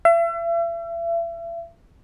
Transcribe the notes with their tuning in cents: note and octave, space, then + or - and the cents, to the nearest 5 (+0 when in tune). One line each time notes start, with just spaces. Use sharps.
E5 +40